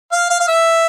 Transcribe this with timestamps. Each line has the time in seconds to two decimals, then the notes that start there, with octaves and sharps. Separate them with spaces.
0.12 F5
0.30 F5
0.40 F5
0.48 E5